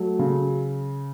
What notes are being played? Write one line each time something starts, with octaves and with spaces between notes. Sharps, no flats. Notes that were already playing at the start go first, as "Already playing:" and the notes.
Already playing: F#3 A3
C#3